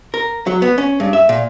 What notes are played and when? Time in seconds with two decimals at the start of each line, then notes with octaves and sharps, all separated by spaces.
0.14 A#4
0.47 F#3
0.62 B3
0.78 C#4
1.00 G2
1.13 E5
1.29 A#2